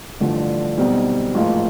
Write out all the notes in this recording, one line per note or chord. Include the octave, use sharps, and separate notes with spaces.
A1 G2 D3 F3
B1 B2 G3 C4 D#4
A1 G#2 F3 A#3